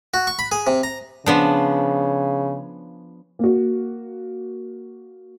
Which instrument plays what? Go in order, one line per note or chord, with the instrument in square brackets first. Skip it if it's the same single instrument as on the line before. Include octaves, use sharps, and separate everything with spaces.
[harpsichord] F#4
C#6
B5
G#4
C3
A#5
[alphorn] C#3 [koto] F3 B3 D4
[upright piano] A#3 F#4